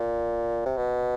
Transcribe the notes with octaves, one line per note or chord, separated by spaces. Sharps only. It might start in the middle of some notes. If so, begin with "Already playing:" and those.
Already playing: A#2
C3
B2